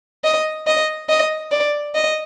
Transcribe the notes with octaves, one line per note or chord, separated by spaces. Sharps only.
D#5
D#5
D#5
D5
D#5